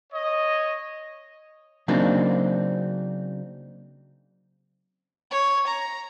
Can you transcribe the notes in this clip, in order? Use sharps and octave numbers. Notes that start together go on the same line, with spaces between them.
C#5 D#5
C#3 F#3 A#3 C4 D4 D#4
C#5
A#5